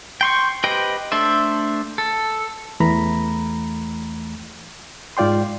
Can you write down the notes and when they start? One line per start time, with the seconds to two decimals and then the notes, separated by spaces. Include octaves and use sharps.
0.21 G5 C6 C#6
0.64 G4 B4 C5 D#5 G5
1.12 A3 D4 A4 C5 E5
1.98 A4
2.80 E2 E3 A3 A#5 B5
5.17 G#2 F4 D5 G5 C6